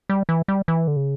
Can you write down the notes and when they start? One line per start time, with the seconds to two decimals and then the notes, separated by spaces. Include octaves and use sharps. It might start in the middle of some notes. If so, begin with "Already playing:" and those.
0.10 G3
0.29 E3
0.48 G3
0.68 E3
0.88 D3
0.96 C#3